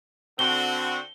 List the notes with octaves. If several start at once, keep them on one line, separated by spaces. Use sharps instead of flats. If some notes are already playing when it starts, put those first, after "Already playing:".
D3 C4 F#4 G7